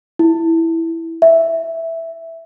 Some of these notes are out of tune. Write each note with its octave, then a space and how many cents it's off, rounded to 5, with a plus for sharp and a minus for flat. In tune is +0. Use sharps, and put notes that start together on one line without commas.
E4 -5
E5 +0